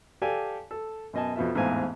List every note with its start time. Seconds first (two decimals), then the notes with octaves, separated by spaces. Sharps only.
0.22 G4 A4 D5 F5 G#5 A5
0.71 A4
1.13 F#2 B2 D#5 G#5 A5
1.36 F2 B2 F4 E5
1.55 A1 E2 G#2 C4 F5 G#5